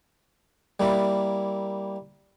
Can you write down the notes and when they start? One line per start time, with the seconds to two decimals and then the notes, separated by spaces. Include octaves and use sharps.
0.80 G3 A#3 E4